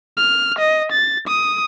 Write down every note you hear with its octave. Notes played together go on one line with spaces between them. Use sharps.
F6
D#5
A6
D#6